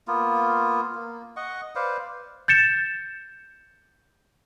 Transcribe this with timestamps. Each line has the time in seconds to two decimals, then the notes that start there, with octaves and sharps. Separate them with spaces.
0.08 A#3 B3 F4
0.95 A#3
1.36 D#5 F#5 C#6
1.75 B4 C5 D5 F5
2.48 G6 A6 C#7 E7